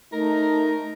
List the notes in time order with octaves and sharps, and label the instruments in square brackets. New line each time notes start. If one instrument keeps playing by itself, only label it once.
[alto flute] A3 [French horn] D#4 [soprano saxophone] A#4